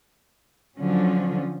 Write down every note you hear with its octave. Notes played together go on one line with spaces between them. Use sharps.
D3 F3 F#3 C#4